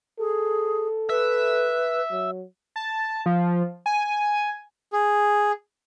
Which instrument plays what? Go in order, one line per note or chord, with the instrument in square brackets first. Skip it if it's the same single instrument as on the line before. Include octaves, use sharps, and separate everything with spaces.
[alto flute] G#4 [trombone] A4
[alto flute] B4 [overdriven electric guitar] E5
[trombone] F#3
[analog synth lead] A5
F3
G#5
[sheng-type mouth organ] G#4